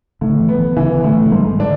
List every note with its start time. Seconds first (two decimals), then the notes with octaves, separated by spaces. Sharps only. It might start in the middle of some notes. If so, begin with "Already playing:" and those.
0.21 A2 D3
0.40 E3
0.49 B3
0.59 E3
0.77 C#3 E3
0.95 D3
1.04 A2
1.13 E3
1.26 D3
1.32 G#2 E3
1.60 D3 D4